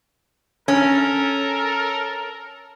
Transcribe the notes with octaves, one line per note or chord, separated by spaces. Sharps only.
C#4 A4 A#4